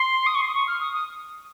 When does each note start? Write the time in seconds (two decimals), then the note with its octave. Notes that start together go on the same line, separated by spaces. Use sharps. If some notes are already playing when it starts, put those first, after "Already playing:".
Already playing: C6
0.26 D#6
0.35 C#6
0.42 C6
0.48 D#6
0.55 C#6
0.67 F6
0.81 D#6
0.93 D#6